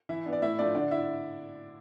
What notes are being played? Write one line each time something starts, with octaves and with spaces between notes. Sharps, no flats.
E3 E4 E5
B3 D4
D5
A2 E4 E5
F3 A3 D4 D5
D3 D4 D5
E4 E5